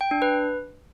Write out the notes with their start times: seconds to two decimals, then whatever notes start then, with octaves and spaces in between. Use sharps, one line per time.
0.01 G5
0.11 D4
0.22 B4